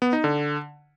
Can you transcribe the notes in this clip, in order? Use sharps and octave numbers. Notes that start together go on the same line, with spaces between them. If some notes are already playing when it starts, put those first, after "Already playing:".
B3
D#4
D3